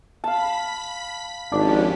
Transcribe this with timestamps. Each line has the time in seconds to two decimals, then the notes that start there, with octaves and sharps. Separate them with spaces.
0.24 F5 A5 B5 B6
1.52 G#1 F3 C#4 D4 G4